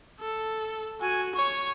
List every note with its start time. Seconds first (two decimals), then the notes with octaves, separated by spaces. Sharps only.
0.20 A4
1.01 F#4 G#5
1.35 C#5 C#6